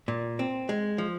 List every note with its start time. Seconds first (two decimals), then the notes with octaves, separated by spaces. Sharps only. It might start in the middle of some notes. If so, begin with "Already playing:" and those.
0.08 A#2
0.39 C4
0.69 G#3
0.98 F3